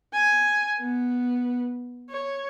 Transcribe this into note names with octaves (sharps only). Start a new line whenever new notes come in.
G#5
B3
C#5